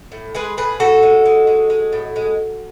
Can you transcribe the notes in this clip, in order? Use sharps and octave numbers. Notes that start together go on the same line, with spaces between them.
A2
G#3 G#4 B4
A2 G#4 B4
A2 F#4 A4
G#3
G#3
G#3
G#3
A2
G#3